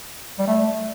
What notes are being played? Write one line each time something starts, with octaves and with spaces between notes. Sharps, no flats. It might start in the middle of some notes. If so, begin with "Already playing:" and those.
G3
A3